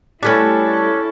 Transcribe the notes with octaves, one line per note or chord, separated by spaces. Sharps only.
G3 A3 C#4 D4 E4 A4 B4